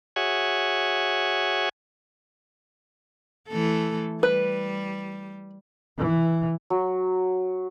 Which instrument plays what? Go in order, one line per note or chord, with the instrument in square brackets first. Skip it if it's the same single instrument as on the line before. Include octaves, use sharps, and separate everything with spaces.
[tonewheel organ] F#4 G#4 C#5 E5 F#5 G#5
[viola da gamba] E3 A3 A4
[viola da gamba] G3 [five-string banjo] B4
[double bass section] E3
[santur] F#3